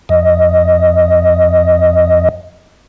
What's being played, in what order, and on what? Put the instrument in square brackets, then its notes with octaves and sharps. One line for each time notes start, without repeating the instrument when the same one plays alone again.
[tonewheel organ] F2 D#5